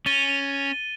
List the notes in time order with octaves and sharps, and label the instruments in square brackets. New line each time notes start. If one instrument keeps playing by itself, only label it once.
[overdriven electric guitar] C#4 [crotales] A6 D#7 G7